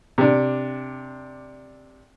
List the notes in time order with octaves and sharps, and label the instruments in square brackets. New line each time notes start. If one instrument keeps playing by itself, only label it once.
[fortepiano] C3 D4